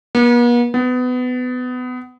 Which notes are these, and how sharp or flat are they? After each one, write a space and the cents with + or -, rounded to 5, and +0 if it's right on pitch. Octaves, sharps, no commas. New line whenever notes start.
B3 -45
B3 +25